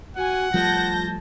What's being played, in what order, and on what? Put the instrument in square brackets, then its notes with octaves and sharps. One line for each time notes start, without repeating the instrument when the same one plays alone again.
[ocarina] F#4 [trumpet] F#5 [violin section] G#5
[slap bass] F3 G3 A3 [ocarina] F4 [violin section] A5 G6 A#6